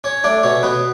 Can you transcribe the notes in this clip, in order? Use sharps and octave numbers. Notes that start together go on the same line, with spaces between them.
C#4 C#5
A3 D4 D5
B2 C#4 C#5
B2 B3 B4